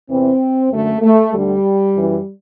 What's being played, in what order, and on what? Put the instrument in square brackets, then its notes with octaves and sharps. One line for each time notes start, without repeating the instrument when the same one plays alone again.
[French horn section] E2 C3 E3 C4
F#2 D3 A3
A3
D2 D3 G3
F#2 E3